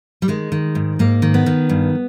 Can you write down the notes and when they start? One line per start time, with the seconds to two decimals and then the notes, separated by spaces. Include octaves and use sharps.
0.22 G3
0.28 D#3 G#3
0.52 D#3
0.75 G#2
0.99 G#2 A#3
1.22 D#3
1.34 B3
1.46 D#3
1.69 G2